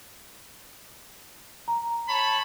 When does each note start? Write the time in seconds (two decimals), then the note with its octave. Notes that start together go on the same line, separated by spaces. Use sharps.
1.68 A#5
2.08 C#5 A5 B5